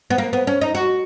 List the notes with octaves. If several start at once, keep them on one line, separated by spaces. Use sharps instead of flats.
B3
A#3
B3
C#4
D#4
F#4